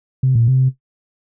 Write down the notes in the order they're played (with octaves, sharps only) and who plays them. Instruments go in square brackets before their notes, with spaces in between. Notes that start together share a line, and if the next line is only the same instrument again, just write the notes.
[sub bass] C3
A#2
C3